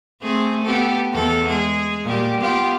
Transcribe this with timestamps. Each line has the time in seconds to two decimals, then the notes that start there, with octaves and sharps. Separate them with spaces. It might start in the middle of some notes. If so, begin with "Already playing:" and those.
0.21 A3 C4 G#4
0.64 B3 G4 A4
1.13 E2 A4
1.48 G#3 G#4
2.04 A#2 G3 G4
2.41 B3 F4 G4